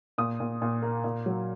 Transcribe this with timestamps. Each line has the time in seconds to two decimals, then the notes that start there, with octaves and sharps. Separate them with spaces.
0.18 A#2 D#6
0.40 A#2
0.62 A#2
0.82 A#3
1.04 A#2
1.26 F#3